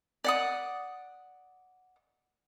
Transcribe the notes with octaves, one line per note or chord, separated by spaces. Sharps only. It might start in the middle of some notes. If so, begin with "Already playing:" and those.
D5 F#5 D#6